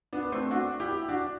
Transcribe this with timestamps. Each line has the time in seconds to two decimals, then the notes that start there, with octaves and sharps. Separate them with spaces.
0.13 B3 D4
0.32 A3 C4
0.51 D4 F#4
0.80 E4 G4
1.09 D4 F#4